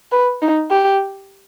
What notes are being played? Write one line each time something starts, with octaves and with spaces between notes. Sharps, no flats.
B4
D#4
G4